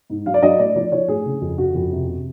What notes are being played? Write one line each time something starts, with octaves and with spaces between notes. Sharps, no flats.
G#2
F#3 F5
D5
F#3 D#5
A2 D5
F3 D5
F3 C#5
A2 G#4
C#3
F2
C#3 F#4
F2
C3
C3